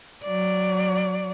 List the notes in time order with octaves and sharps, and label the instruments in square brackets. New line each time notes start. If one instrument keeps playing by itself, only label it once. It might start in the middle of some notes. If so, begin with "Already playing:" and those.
[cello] F#3 D5